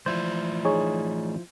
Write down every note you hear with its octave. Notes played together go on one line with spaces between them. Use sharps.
E3 F3 A3 E4 C5 D5
D#4 G#4 C#5